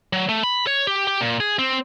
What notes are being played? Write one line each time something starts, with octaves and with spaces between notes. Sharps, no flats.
F#3
A3
B5
C#5
G4
G4
A#2
G#4
C4